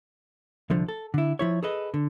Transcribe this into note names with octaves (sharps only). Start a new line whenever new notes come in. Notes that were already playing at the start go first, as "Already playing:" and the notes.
C2 D3 F3
A4
D3 E4
F3 E4 C#5
G#4 A4 B4 D#5
D3